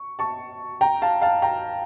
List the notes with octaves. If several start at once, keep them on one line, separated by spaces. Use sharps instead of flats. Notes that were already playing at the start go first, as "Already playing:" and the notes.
Already playing: C#6
A5 C#6
G5 A#5
F5 A5
F5 A5
G5 A#5